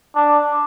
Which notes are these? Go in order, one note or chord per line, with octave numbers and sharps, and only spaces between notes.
D4